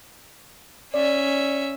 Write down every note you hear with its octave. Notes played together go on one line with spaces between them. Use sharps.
C#4 D5 E5